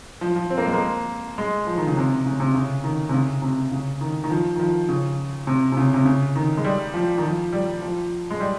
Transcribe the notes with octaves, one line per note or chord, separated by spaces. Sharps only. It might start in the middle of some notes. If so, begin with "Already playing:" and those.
F3
F3
C4
A#3
G#3
A#3
G#3
F3
D#3
C#3
C3
C#3
C3
C#3
D#3
C3
C#3
C3
C#3
D#3
D#3
F3
D#3
F3
C#3
C3
C3
C#3
C3
C#3
D#3
G#3
G3
F3
D#3
F3
G3
F3
G#3
G3